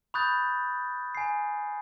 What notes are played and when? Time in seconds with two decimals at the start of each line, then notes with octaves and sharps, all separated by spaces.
0.14 B5 C#6 D#6 F#6 G6 A6
1.15 G#5 C7